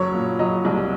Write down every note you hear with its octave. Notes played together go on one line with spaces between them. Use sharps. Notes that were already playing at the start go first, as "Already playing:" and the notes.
Already playing: F#1 F#3 C#5
A#2
F#3 D#5
C2